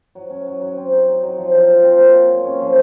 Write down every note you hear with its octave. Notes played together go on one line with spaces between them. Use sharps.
F#3
C#4
F#3
F#3
C4
D#4
D#4
F#3
F3
F3
F3
C4
A#3
F#3
A#3
C#4
F3